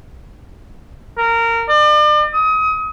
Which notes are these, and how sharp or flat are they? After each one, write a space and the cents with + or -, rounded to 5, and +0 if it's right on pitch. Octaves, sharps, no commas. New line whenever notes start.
A#4 -20
D5 +40
D#6 +30